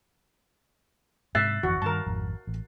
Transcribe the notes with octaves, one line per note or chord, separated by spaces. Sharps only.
G#2 C3 E5 F#6 A6 C7
G1 F2 E3 F#4
G2 C3 D#3 A#4 A5
G#1 F2
A1